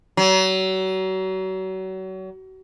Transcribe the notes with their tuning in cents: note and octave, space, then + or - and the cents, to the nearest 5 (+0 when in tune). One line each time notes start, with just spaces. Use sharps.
F#3 +35